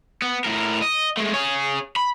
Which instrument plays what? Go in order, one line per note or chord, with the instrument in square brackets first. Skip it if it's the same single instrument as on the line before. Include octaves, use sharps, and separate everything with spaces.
[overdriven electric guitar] B3
A2 A#4
D#5
G#3 A3
G#4 C#5
B5